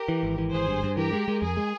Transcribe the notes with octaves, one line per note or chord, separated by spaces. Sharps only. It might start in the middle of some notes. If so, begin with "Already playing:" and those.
Already playing: G4 A#4
E3
G#1
E3
G#1 G#4 C5
G2
G2
E3 G4 A#4
G#3
G#3
F2 G#4
G#3